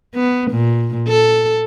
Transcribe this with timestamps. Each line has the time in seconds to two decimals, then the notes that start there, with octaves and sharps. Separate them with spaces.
0.15 B3
0.51 A#2
1.08 A4